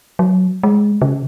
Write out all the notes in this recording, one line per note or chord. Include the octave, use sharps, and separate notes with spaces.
F#3
G#3
C#3